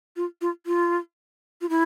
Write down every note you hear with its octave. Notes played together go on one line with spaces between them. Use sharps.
F4
F4
F4
F4
E4